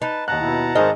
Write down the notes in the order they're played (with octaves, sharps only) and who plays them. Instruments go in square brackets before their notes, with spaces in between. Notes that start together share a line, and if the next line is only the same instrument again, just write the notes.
[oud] D#4 [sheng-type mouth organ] B4 A5
[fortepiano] D#2 F#6 [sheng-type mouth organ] F#5 A5 A#5
[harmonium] B2 E4
[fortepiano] G#1 G#4 F6 [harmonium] D#4 A#4 C5 [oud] D#5